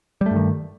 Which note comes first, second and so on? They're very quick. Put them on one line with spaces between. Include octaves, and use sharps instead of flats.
G3 A3 G2 D#3